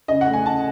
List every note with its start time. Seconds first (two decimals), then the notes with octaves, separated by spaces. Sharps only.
0.08 C#3 D#5
0.21 F#5
0.27 A3
0.33 G#5
0.46 C#3 A5